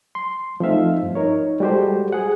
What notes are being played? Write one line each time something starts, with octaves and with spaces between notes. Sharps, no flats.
C6
F3 A3 C4 D#4 E5 F5
G2
D#4 A#4 C#5
G3 G#3 F#4 G4 A4 C5
G#4 F#5